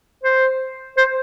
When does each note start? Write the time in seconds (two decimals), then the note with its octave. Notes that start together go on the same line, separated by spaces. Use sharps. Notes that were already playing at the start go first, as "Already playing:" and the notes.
0.23 C5
0.98 C5